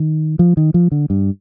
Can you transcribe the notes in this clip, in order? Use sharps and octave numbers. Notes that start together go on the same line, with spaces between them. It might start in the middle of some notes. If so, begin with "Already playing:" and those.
Already playing: D#3
F3
D#3
F3
D3
G2